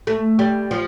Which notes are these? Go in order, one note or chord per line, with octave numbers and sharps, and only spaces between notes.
A3
G3
F3